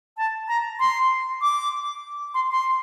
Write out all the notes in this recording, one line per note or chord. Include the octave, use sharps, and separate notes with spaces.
A5
A#5
C6
D6
C6
C6